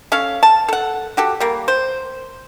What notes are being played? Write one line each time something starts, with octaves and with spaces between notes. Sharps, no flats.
C#4 A4 F5
A5
A4 F#5
F#4 G4 A4
G3 A#3
C5